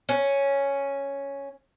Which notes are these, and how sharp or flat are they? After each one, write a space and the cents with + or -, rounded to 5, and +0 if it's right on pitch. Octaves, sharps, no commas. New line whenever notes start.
C#4 +0